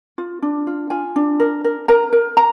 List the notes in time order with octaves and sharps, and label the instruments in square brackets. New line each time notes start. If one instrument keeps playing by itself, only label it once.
[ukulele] F4
D4
F4
F4 G#5
D4
A#4
A#4
A#4 A#5
A#4
A#5